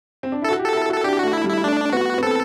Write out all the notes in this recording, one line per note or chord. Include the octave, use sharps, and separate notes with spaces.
C4
D4
E4 A4
F#4
G4
A4
E4
F#4
A4
D4 G4
A3 F#4
E4
G3
E4
A3 D4
B3 F#4
B3
C4 A4